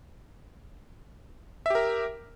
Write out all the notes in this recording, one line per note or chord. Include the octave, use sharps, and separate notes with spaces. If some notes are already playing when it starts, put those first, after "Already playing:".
G4 A#4 E5